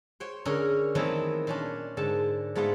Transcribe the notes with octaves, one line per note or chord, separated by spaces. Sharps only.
C5 C#5 G5
D3 C#4 G#4 A#4 A#5
D#3 E3 F#3 A3 B3 C4
A#2 C#4 D4
G#2 D3 A5
G#2 A3 B3 F4 F5 F#5